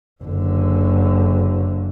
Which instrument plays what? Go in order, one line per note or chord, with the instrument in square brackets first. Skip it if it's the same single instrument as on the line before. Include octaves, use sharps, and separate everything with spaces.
[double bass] F#1 D3